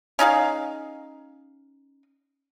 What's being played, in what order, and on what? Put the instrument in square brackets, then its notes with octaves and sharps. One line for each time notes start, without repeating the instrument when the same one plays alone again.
[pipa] C#4 D#4 G#4 F5